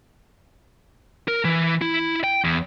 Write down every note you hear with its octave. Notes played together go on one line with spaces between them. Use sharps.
A#4
E3
E4
G5
E2